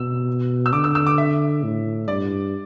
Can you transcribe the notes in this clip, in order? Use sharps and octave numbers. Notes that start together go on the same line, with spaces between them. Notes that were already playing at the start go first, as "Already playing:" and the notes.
Already playing: B2 E6
E6
D3 D6
E6
E6
D6
E5
A2
G2 D5